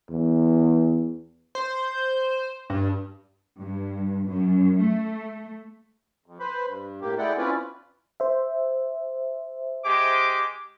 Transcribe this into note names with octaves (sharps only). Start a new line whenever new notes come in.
E2
C5
G2
G2
F#2
A3
F2
B4 C5 B5
G2
A2 A#3 G4
G#3 A3 E4 D5 F#5 G5
C4 C#4 E4 F4 B4 D5
C5 E5
G#3 G4 D6